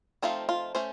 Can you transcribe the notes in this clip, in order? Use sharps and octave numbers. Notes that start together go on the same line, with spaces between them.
F3 A3 C4 D#4 F4
F4
A3 C#4 C5